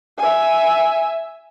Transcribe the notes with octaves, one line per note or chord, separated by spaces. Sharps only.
E5 G#5